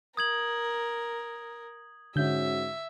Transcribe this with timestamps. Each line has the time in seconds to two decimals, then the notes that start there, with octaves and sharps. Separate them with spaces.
0.17 A#4 D#6 G#6 F#7
2.16 G#2 D3 C#4 F#4 E5 G6